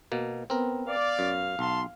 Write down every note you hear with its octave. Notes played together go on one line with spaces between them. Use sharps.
B2 A#3
B3 C4 A#4
D5 F5
F#2
B1 A5 C6